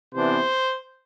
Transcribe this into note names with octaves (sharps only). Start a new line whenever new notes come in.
C3 E3 B3 D4 C5